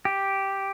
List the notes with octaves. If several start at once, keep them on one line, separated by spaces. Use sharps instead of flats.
G4